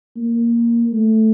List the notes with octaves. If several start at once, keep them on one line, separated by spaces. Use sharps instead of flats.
A#3
A3